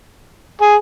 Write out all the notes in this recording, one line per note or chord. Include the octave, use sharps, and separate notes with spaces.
G#4